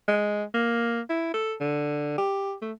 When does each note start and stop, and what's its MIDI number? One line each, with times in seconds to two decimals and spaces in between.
0.08 0.44 56
0.54 1.01 58
1.09 1.29 64
1.34 1.55 69
1.60 2.17 50
2.18 2.54 67
2.62 2.72 57